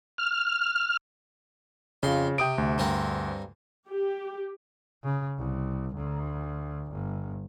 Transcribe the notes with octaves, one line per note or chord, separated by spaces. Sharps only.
F6
F2 C#3 C6
C3 G5 D#6 D7
D2
G2 C4 A#4
G4
C#3
C2
D2
G1